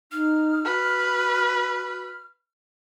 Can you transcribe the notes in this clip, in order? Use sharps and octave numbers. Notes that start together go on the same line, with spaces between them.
D#4 F6
F#4 B4